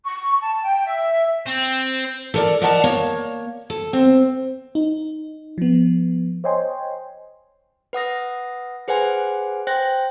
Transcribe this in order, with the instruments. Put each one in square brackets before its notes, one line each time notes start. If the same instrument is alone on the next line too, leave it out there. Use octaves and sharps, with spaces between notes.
[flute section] C#6
A5
G5
E5
[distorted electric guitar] C4
[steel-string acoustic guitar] A4 A#4 D5
A#4 D5 D#5 F#5 A5 A#5
A#3 C#5
A4
C4
[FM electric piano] D#4
F3 B3
C5 C#5 D#5 G5 G#5 C6
[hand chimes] B4 F#5 D#6 A#6
G#4 B4 C5 F#5 G#5
C5 G5 F#6 A#6